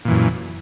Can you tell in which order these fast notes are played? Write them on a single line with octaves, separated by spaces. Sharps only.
A#2 E3 F#2